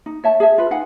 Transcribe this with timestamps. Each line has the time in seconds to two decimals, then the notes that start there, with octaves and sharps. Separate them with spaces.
0.06 D#4
0.24 C#5 E5 A5
0.40 G#4 E5
0.58 F4 B4
0.71 D#4 F5 F#5 G#5